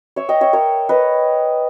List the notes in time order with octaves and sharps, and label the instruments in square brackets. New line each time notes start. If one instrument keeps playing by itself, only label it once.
[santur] C#5 E5
D#5 G5
C#5 E5
A#4 C#5
B4 D#5